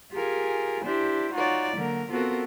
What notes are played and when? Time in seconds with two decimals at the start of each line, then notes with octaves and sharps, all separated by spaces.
0.13 F4 G4 G#4 A#4 G#5
0.85 D4 E4 G4 C5
1.34 D#4 F4 F#4 C#5 D5
1.77 D3 F#3 A#3 A#4
2.09 B3 C4 F4 F#4 A4 A#4